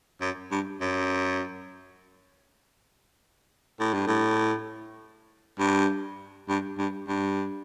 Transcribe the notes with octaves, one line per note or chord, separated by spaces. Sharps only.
F#2
G2
F#2
A2
G2
A2
G2
G2
G2
G2